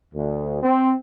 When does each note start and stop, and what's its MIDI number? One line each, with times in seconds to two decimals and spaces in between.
0.14 0.60 38
0.63 0.93 60